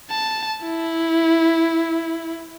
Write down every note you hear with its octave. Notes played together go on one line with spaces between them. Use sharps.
A5
E4